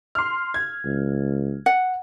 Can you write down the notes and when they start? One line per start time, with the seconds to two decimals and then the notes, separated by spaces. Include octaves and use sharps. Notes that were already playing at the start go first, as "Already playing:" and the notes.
0.15 C6 F6
0.54 G#6
0.85 C#2
1.66 F#5